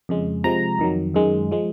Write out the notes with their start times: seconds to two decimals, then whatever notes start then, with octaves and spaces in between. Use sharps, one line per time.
0.09 F2 C#3 G#3
0.44 C3 F3 G#3 A#5
0.79 F2 D#3 F#3
1.14 F#2 D#3 G#3
1.51 F3 G#3